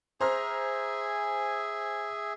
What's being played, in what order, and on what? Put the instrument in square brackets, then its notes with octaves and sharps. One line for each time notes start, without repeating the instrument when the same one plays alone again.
[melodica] G#4 E5 G#5 [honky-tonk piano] C5 A#5 F6